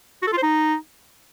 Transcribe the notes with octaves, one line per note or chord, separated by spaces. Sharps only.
F#4
A4
F4
C5
D#4